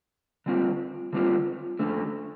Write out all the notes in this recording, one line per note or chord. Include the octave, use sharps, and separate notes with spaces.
D3 G3 C4 F4
D3 G3 C4 F4
F2 D3 A3